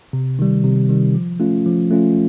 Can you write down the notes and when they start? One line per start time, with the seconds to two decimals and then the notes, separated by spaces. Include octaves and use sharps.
0.13 C3
0.39 D#3 G3
0.64 C3
0.89 D#3 G3
1.14 F3
1.40 A3 C#4 F4
1.66 F3
1.91 A3 C#4 F4